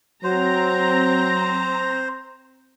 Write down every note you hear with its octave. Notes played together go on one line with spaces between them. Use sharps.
F#3 C4 C5 A#5